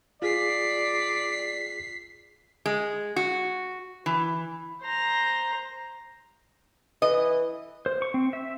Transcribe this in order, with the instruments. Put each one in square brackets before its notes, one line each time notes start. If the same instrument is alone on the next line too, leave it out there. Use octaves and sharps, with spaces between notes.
[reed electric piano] F4 G#4 [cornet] D5 [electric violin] B6 C7
[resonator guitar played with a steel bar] G#3
F#4
E3
[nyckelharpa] C5 A#5
[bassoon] E3 [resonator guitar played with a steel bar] D#5
[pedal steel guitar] C5
C#6
C4
E5